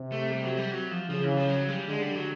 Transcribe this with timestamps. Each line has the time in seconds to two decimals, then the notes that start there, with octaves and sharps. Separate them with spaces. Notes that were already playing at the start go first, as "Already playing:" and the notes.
Already playing: C3
0.12 A3
0.31 G3
0.44 F#3
0.57 G3
0.71 F#3
0.91 F3
1.10 C#3 F3
1.24 E3
1.37 F3
1.49 F#3
1.69 G3
1.89 D3 G#3
2.02 G3
2.15 F#3